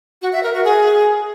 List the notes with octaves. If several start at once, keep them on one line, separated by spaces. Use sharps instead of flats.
F#4
E5
A#4
F#4
G#4